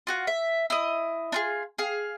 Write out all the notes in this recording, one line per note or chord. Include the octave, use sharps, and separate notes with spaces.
F4 F#4 F#5
E5
E4 D#5
D4 F4 G#4
G#4 F5